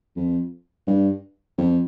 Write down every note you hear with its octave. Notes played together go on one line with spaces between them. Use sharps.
F2
G2
F2